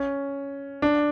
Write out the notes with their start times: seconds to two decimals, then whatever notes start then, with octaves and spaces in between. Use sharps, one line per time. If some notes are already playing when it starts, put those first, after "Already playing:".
Already playing: C#4
0.82 D4